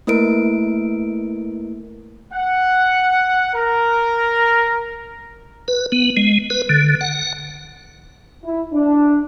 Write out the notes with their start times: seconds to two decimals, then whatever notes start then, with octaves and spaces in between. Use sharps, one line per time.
0.07 A3 A#3 E4 A#4 B4 D7
2.32 F#5
3.54 A#4
5.68 B4
5.92 B3
6.17 G#3
6.50 B4
6.69 D3
7.01 F#5
8.44 E4
8.73 D4